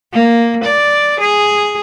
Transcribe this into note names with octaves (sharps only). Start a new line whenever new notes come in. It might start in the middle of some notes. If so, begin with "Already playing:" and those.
A#3
D5
G#4